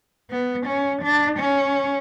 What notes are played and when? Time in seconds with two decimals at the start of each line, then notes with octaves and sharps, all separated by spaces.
0.31 B3
0.67 C#4
1.03 D4
1.39 C#4